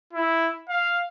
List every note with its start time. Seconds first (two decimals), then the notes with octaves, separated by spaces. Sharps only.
0.13 E4
0.69 F5